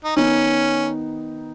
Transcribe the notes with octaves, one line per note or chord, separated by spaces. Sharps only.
D#4
D#3 B3 C#4 D#4